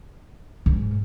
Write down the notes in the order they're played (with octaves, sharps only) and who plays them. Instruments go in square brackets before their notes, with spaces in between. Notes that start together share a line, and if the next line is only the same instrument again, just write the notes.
[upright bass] G#2